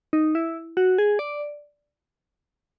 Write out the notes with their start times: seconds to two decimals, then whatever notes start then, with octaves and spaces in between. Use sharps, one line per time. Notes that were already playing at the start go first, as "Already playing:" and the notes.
0.13 D#4
0.35 E4
0.77 F#4
0.98 G#4
1.19 D5